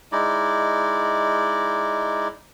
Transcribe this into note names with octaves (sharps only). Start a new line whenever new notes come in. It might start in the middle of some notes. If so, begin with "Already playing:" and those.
G#3 D#4 E4 D5